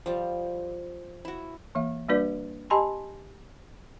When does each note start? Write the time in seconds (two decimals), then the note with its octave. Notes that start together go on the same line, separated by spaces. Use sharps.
0.06 F3 G3
1.25 E4 F#4
1.75 E3 A#3 E5
2.09 G3 A#3 D4 F#4 B4 D5
2.70 G4 D#5 G#5 A5 B5 C6